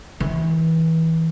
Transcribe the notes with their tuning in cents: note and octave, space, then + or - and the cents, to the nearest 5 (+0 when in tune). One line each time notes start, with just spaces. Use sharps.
E3 -25